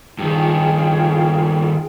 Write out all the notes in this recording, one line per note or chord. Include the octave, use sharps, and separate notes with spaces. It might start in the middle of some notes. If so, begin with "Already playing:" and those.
G2 D#3 F4 G#4 G5